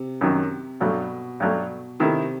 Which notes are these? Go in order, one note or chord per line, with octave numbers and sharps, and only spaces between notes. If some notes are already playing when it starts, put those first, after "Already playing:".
Already playing: C3
F#2 D#3 F#3
G2 B2 F#3 A3
G2 F#3 A3
C3 D#3 A3 E4